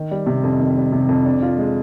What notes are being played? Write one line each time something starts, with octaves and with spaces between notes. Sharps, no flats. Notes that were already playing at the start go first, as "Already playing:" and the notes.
Already playing: D#3
G3
C3
F2
D#3
G3
C3
F2
D4
F4
G#3